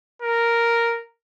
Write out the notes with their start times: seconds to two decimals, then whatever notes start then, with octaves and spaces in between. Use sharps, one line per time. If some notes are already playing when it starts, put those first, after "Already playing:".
0.22 A#4